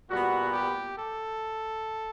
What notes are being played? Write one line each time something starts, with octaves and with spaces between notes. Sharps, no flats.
A#2 G3 B3 F#4
G4
A4